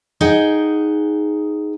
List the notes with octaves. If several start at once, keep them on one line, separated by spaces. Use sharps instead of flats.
D#4 G#4 F#5 G5